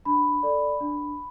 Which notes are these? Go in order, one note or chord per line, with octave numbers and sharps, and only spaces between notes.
D4 B5
A4 D5
D4